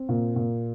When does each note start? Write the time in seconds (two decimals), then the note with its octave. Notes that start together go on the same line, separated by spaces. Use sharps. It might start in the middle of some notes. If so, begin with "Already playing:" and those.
Already playing: C4
0.09 A#2
0.36 A#2